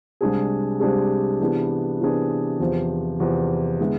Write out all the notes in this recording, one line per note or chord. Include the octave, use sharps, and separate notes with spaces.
C2 C3 G#3 D4 G#4
C2 C3 G#3 D4 G#4
C3 E3 B3 D4 G#4
C3 E3 B3 D4 G#4
E2 C3 F3
E2 C3 F3
D3 G#3 B3 E4